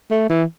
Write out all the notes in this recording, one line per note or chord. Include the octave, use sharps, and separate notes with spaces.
A3
E3